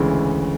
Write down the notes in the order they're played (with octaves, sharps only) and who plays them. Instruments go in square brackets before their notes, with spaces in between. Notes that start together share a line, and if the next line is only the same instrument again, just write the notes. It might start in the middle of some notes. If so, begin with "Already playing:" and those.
Already playing: [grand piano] D2 C#3 E3 G#3